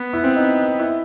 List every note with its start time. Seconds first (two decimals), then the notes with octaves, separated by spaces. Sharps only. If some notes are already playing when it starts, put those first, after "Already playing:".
Already playing: B3
0.13 E4
0.24 C4
0.36 D#4
0.80 E4